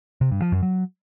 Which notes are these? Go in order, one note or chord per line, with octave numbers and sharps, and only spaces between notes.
C3
G2
F3
F#2
F#3